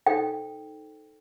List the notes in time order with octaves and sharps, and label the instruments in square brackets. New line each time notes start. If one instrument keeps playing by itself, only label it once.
[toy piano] D#4 A4 C5 G5